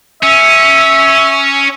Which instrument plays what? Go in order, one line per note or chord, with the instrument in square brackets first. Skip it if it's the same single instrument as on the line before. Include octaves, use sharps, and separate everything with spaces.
[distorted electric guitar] C#4 [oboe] E5